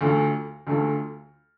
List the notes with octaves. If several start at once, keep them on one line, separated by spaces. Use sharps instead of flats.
D2 D3 A3 F4
D2 D3 A3 F4